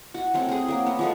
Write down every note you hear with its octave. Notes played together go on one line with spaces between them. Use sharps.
F#4
F#3 A3 C4
C4 G#4
F#3 A#3
B3
F3 G#3 A3